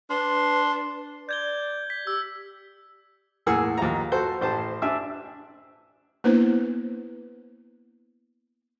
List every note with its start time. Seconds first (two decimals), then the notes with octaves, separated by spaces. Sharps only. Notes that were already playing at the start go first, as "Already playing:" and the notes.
0.10 D4 B4 C6
1.29 D5 G6 G#6 G7
1.90 B6
2.07 G4 E6
3.46 E2 A2 A#3 G#4 F#5 E6
3.77 D#2 F3 F5 A#5
4.12 F#4 A4 C5
4.41 A1 C5 A5
4.82 D4 E5 G#5 E6
6.24 A#3 B3 D4 E4 B4 C5